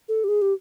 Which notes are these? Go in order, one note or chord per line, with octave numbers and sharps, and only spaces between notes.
A4
G4
G#4
G4